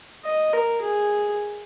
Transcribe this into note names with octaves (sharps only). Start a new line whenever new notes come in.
D#5
A#4
G#4